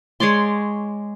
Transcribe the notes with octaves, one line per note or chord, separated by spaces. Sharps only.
G#3 C#5 D5 C6